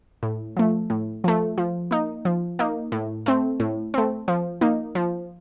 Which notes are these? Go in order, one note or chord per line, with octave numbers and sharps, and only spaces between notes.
A2
F3 A3
A2
F3 A3
F3
A#3 D#4
F3
A#3 D#4
A2
A3 C4
A2
A3 C4
F3
A#3 D#4
F3